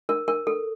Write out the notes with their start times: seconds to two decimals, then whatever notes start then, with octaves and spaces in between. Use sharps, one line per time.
0.09 A#4
0.28 A#4
0.47 A4